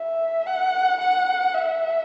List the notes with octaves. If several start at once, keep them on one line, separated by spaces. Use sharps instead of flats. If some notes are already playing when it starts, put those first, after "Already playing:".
Already playing: E5
F#5
F#5
E5